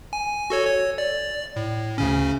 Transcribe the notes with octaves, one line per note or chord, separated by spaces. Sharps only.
G#5
F#4 A4 C#5
C#5
D5
A2
D2 C#3 C#4